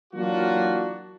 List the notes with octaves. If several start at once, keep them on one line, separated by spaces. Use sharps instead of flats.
E3 F#3 A#3 D4 F4 F#4